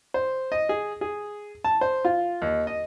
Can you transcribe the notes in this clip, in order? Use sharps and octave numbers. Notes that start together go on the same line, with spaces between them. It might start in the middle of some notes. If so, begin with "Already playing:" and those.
C5
D#5
G#4
G#4
A5
C5
F4
D#2
D#5